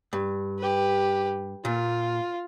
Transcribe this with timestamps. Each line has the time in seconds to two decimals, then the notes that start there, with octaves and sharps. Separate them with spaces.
0.13 G2
0.58 G4 B4
1.65 A#2 F4